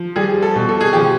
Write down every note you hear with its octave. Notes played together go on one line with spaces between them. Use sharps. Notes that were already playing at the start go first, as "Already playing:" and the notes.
Already playing: F3
G3 G#4
A4
B2
A4
G#4
F3 G4